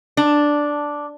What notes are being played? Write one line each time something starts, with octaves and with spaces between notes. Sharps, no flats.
D4